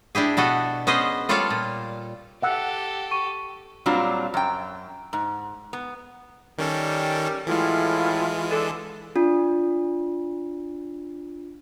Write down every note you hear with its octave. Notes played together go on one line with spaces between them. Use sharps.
D4 E4 G4 G#4
B2 B3 F#4 A4
B3 C#4 G#4 C5 D#5
G3 F4 A4 C#5 D5 F5
A#2
G4 A4 E5 F#5 E6
C#6 D#7
A#2 F#3 G3 C4 D4 F4
F#2 G5
G#2
B3
D#3 G3 C#4 A4 A#4
A2 E3 F#3 G#3 E4 F4 F6
D3 A4
D4 F4